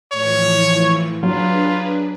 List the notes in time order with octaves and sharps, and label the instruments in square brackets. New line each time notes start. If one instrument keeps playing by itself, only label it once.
[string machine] A2 E3 F3 [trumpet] C#5
[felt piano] F#3 [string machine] D4 G#4 B4 [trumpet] F4